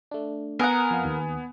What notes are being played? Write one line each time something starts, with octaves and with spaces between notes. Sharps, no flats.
A3 D4
B3 A#4 F#5 G#5 D#6
F2 F5
D#2